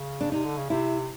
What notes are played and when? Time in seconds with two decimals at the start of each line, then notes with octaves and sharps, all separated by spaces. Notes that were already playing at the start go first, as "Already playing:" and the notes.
Already playing: C#3
0.21 D4
0.32 C3 D#4
0.45 D3
0.58 C#3
0.70 C3 E4